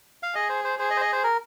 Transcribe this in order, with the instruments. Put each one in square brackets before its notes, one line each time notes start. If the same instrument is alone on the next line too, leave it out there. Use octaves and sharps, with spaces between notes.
[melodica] F5
[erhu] G#4 [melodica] D#5
[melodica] C5
C5
[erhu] G#4 [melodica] C5
[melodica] D#5
C5
D#5
C5
A#4